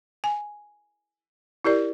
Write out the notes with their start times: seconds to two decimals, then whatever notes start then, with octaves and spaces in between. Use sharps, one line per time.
0.24 G#5
1.64 E4 G4 A#4 D5